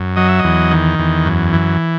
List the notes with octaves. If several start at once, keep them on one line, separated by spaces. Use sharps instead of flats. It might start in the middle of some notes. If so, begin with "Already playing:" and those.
Already playing: F#2
F#3 D#5
E5
E2 D#5
D#3
E2
F#2
E3